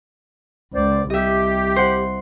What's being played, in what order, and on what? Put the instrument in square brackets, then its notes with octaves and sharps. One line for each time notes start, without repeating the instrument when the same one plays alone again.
[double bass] C#2 [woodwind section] C5 D5
[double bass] C2 [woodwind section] G4 [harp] D#5 E5
[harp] C5 F#5